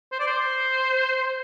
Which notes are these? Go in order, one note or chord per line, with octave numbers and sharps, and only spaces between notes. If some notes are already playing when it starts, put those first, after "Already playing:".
C5
D5
C5